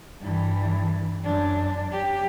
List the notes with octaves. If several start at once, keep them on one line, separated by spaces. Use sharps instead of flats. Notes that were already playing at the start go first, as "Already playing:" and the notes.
G2 E3
F#2 D4
F#3 G4